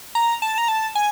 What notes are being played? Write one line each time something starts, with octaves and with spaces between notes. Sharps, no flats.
A#5
A5
A#5
A5
G#5